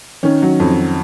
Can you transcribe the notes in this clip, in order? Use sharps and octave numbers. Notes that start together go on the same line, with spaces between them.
D#3 C#4
F#3
F2